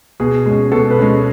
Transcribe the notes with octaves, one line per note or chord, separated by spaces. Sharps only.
B2 G#4
G#3 C#4
B2 A4
B4
G#3 C#4